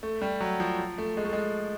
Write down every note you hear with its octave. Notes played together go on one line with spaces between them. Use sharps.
A3
G3
F#3
F3
F3
A3
G#3
A3
G#3